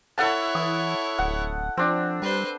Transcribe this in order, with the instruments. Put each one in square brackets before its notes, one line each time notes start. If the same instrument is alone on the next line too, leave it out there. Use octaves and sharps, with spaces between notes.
[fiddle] E4 C#5 [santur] A4 F#5 A5
[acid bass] E3 [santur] D#6
[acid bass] D1 [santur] F#5
[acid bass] F3 [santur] C4 D4
[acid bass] G3 [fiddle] B4 C5